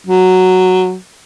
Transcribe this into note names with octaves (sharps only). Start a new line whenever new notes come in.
F#3